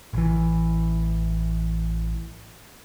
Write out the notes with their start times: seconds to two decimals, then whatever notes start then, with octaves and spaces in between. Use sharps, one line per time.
0.13 A1 E3